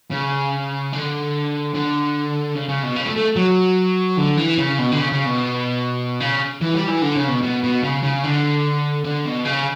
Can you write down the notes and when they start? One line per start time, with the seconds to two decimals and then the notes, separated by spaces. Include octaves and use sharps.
0.11 C#3
0.93 D3
1.74 D3
2.55 C#3
2.69 C#3
2.83 B2
2.96 C#3
3.06 A3
3.16 A3
3.36 F#3
4.18 D3
4.37 E3
4.58 C#3
4.79 B2
4.92 D3
4.99 C#3
5.12 C#3
5.26 B2
6.20 C#3
6.61 E3
6.74 G3
6.88 E3
7.02 D3
7.16 C#3
7.28 B2
7.42 B2
7.63 B2
7.83 C#3
8.03 C#3
8.24 D3
9.04 D3
9.25 B2
9.45 C#3